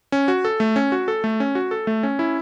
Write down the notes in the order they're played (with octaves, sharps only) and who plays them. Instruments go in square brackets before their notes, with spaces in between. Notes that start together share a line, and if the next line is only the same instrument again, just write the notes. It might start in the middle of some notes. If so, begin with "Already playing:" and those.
[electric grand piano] C#4
F#4
A4
A3
C#4
F#4
A4
A3
C#4
F#4
A4
A3
C#4
E4